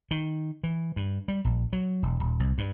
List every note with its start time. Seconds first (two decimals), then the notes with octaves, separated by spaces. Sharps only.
0.11 D#3
0.63 E3
0.96 G2
1.28 G3
1.45 A#1
1.73 F#3
2.02 E1
2.20 D#1
2.40 C2
2.58 G2